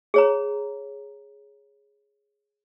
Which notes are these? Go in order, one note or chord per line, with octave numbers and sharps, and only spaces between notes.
G#4 C#5 A#5